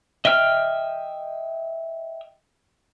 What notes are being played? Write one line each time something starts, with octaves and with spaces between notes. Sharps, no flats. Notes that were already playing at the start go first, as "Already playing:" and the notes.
D#5 E5 G5 F6